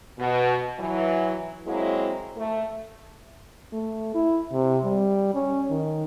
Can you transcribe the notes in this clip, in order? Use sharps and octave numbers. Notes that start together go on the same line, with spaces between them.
B2
E3 F#3
F#3 G#3 A#3 C4 E4
A3
A3
E4
C3
G3
C#4
D#3